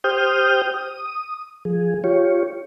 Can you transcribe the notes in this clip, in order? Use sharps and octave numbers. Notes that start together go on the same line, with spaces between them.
G4 C5 G5 D#6 F6 G6
D#6
F3 G#4
F4 G4 C#5